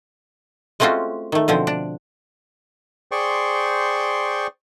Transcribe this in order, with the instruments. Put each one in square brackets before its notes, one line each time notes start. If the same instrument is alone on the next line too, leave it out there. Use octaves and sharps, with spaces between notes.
[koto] G#3 A3 C4 C#4 F4 F#4
D#3 A3
B2 D3 F3 C4
D4
[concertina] G#4 C5 D5 G5 C6 C#6